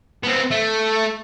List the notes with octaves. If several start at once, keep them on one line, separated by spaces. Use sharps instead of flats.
B3 C4
A3